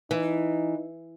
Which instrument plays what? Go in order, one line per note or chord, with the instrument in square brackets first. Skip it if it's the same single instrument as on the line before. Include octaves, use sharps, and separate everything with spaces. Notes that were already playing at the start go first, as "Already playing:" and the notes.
[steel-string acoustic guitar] E3 [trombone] D#4